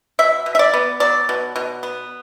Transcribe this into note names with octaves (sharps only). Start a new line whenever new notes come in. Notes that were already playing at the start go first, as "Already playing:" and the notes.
B2 E5
B2
E5
D5
B3
F#3 D5
B2
B2
B3